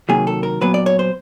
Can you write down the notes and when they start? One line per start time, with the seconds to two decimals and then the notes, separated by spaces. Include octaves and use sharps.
0.09 C3 D#3 F#3 A#3 G#4
0.27 A4
0.43 A#4
0.61 A#2 F#3 B3 B4
0.74 D5
0.86 C#5
0.99 C5